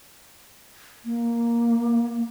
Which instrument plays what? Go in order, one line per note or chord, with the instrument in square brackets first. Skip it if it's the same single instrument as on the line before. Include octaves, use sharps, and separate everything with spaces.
[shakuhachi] A#3